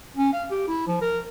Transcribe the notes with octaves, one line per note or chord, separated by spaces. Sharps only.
C#4
F5
G4
E4
F3
A#4